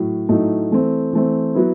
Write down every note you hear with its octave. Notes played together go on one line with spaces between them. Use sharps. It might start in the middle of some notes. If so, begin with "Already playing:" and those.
Already playing: A2 F#3
A2 F#3 A3 D#4
E3 A3 C4
E3 A3 C4
F#3 B3 E4